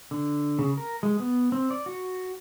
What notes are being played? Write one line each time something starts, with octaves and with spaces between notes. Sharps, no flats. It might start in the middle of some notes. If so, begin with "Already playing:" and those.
D3
C#3
A#4
G#3
B3
C4
D5
F#4